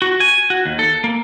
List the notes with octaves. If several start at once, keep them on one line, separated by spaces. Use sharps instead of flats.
F#4
G#5
F#4
D#2
A4
A#3